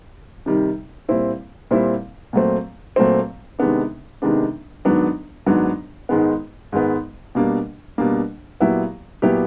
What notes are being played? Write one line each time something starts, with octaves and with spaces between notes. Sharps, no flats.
C3 D#3 G3
A#2 G3 C4 E4
A#2 G3 C4 E4
A#2 F#3 A3 C4
A#2 F#3 A3 C4
C3 D#3 G#3 B3 D4
C3 D#3 G#3 B3 D4
G#2 D#3 F#3 B3 D4
G#2 D#3 F#3 B3 D4
G#2 D#3 G#3 B3
G#2 D#3 G#3 B3
B2 G3 A#3 D4
B2 G3 A#3 D4
A#2 F#3 B3 E4 G4
A#2 F#3 B3 E4 G4